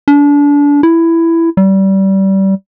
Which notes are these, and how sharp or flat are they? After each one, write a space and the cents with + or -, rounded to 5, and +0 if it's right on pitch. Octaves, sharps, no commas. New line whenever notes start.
D4 -30
E4 +10
G3 -25